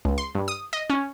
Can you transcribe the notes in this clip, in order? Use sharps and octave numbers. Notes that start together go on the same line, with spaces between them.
C#2
C6
G2
D#6
D#5
C#4